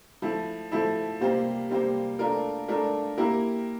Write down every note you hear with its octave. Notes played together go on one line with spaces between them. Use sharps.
F3 A3 E4
F3 A3 E4
C3 G3 A#3 F4 C5
C3 G3 A#3 F4 C5
A3 D4 F4 A#4
A3 D4 F4 A#4
A#3 E4 G4 A#4